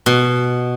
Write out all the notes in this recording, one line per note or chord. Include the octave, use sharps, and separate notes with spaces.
B2